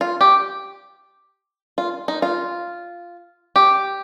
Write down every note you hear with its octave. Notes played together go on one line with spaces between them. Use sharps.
F4
G4
F4
D#4
F4
G4